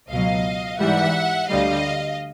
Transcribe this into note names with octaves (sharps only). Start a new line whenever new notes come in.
C#2 B2 F#3 D#5 F5
G#2 E3 G3 E5 F#5
D2 D3 G3 D#5 F5